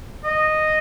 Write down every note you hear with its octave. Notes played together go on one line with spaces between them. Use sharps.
D#5